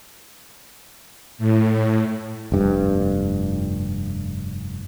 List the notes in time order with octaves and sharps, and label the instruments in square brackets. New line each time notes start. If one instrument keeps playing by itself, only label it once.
[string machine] A2
[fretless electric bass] F1 G2